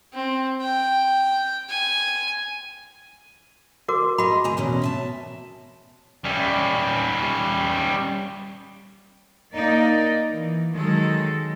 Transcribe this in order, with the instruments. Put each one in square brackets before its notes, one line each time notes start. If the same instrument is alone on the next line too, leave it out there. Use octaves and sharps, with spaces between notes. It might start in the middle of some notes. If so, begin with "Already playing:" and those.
[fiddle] C4
G5
G#5
[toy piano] F#4 A#4 D6
[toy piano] F#4 B5 [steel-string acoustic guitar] G#4 D#5
[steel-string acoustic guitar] D2 G#5 A#5
E2 B2 C#4
E5 G#5 A5
[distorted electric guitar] G3 C#4
[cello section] A#3 D#4 D5
E3
D#3 F#3 G#3 A4